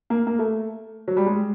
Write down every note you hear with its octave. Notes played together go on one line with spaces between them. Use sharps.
A#3
A#3
A3
F#3
G3
G#3